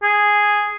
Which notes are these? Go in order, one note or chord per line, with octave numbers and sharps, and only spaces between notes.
G#4